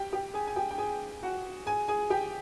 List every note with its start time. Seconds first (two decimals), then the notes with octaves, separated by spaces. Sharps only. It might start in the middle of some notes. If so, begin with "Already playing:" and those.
Already playing: G4 G5
0.13 G4 G5
0.34 G#4 G#5
0.47 G#5
0.56 G4 G5
0.71 G5
0.78 G#4 G#5
1.23 F#4 F#5
1.66 G#4 G#5
1.88 G#4 G#5
2.10 G4 G5